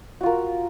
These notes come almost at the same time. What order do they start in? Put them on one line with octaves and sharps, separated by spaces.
F#4 F4 A#4